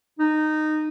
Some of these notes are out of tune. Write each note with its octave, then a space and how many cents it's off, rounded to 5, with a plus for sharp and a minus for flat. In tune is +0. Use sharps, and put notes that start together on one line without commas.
D#4 -15